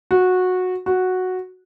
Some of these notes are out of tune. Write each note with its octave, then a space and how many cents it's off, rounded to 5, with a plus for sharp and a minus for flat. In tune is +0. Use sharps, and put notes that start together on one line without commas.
F#4 -15
F#4 -5